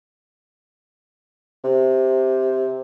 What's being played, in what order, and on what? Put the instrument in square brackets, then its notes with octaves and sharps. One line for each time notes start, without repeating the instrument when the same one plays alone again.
[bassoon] C3